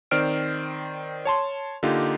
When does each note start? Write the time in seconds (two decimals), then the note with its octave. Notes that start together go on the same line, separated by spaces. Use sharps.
0.11 D#3 C4 C5 D5 F6 D7
1.25 C#5 A5 C6
1.83 D3 A#3 D#4 F4 G4